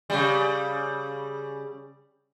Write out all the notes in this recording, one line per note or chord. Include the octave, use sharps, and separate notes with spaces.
C#3 G3